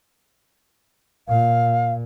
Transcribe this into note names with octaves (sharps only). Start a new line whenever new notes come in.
A#2 F5